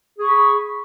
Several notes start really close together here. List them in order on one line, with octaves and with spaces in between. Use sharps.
G#4 C#6 B5